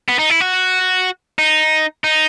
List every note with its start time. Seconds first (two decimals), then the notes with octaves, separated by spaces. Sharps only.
0.09 B3
0.19 D#4
0.30 E4
0.41 F#4
1.39 D#4
2.04 D#4